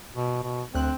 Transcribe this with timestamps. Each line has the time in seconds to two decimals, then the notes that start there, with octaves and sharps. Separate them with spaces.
0.16 B2
0.43 B2
0.75 D2 C4 F#6